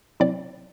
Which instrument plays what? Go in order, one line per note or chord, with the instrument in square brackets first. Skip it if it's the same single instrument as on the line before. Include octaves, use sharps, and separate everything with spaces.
[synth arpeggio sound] C3 F#3 C4 E4 D5